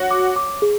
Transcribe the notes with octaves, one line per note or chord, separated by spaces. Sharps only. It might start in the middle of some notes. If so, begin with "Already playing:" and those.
Already playing: F#4 C#5
D6
D6
G#4